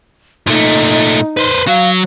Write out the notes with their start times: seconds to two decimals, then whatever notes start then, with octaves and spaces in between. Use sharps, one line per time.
0.47 A#2 A3 D#4
1.37 B4 C5
1.67 F#3 F5